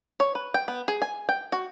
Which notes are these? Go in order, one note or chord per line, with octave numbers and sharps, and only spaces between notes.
C#5
B4
G5
B3
G#4
G#5
G5
F#4